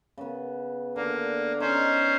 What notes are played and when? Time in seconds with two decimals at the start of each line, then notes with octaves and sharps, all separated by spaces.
0.18 C#3 B3
0.96 D3 A#3 B4
1.60 C#4 D#4 C5